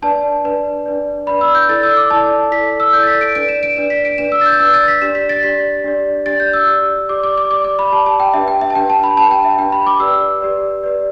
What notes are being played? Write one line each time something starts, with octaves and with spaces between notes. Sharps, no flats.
D4 B4 D5 A5
D4 B4 D5
D4 B4 D5
D4 B4 D5 B5
E6
G6
E4 A4 D5 A6
E6
D6
E4 A4 D5 A5
E4 A4 D5 B6
E6
E4 A4 D5 G6
A6
B6
D7
D4 B4 D5 D7
E7
D7
D4 B4 D5 E7
B6
D7
D4 B4 D5 E7
E6
A6
G6
D4 B4 D5 E6
A6
B6
D4 G4 D5 E7
B6
A6
D4 G4 D5 B6
D4 G4 D5
D4 G4 D5 A6
G6
E6
G4 D5
G4 D5 D6
D6
D6
G4 D5 D6
D6
B5
G4 D5 A5
A5
G5
D4 G4 B4 E5
G5
E5
A5
D4 G4 B4 G5
A5
B5
D4 G4 B4 A5
G5
E5
D4 G4 B4 G5
B5
D6
G4 B4 D5 E6
G4 B4 D5
G4 B4 D5